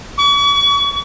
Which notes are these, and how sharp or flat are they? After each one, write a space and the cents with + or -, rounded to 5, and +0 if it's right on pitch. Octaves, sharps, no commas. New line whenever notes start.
C#6 +40